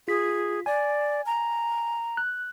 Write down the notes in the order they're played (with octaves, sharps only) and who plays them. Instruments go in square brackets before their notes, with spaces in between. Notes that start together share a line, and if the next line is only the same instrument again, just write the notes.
[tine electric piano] F4 B6 [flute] G#4
[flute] D5 [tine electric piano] G#5
[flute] A#5
[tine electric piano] F#6